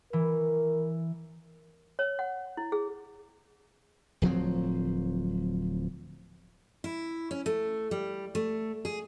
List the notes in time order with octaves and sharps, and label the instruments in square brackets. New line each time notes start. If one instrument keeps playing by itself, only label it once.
[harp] E3 [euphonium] A#4
[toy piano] C#5
F#5
E4
G#4
[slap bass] D1 F3 F#3 C4
[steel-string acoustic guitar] E4
C#4
A3
G3
A3
G#4